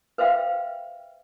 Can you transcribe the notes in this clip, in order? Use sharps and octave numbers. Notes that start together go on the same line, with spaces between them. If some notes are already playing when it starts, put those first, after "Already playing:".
B4 C5 E5 F5 G5